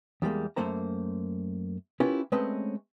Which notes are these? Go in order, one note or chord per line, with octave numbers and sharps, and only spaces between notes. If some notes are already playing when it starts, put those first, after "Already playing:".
E2 G3 G#3 A#3
F#2 E3 A3 A#3 C5 A#5
C#4 E4 F4 G4 A#4 B4
G#3 A3 C4 C#4 B4 D#5